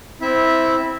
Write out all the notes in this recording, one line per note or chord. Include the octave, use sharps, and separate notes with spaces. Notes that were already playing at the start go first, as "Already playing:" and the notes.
C4 E4 E5